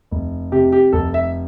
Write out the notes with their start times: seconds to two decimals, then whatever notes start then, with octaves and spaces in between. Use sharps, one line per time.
0.11 F1
0.52 C3 G4
0.72 G4
0.93 F1 A4
1.14 E5